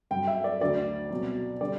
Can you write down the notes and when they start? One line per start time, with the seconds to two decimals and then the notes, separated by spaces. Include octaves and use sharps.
0.11 G2 F#3 G5
0.28 E5
0.44 D5
0.60 D2 D3 F#3 D5
1.10 C2 B2 F#3
1.61 D3 G3 D5